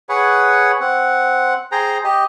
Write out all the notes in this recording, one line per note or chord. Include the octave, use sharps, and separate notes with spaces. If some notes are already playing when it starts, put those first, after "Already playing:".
G#4 B4 C#5 F#5
C4 F#5
G#4 C5 G5 A#5
G4 D#5